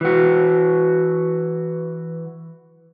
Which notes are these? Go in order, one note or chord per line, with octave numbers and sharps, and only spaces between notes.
E3 F#4